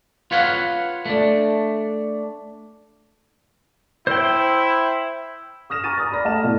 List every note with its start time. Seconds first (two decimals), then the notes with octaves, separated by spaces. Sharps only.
0.31 F4 B4 C#5 F5 F#5
1.06 A3 D4
4.07 E4 C5 G5
5.70 D#6 F6 A#6 E7
5.84 G#5 A#5 C#6 D6 A6 D#7
5.97 A#5 D#6 F6 A6
6.11 D5 B5 A#6
6.25 A3 D#5 F#5 A5 F6 E7
6.44 B2 A3 D4 E4